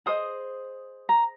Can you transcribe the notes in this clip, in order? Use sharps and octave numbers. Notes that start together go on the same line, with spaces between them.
G#4 C5 D#5 D#6
A#5